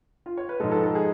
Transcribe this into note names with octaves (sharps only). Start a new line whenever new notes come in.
F4
C#5
B4
G#2 F3 G#3 A4
A4
A4
G#4